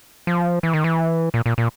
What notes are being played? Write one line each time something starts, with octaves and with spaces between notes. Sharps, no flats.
F3
E3
D#3
E3
A#2
A#2
A#2